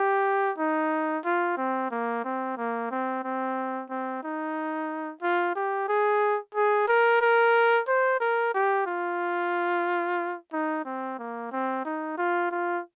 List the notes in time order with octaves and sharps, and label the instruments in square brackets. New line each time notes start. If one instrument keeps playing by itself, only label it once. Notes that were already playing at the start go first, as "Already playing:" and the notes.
Already playing: [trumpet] G4
D#4
F4
C4
A#3
C4
A#3
C4
C4
C4
D#4
F4
G4
G#4
G#4
A#4
A#4
C5
A#4
G4
F4
D#4
C4
A#3
C4
D#4
F4
F4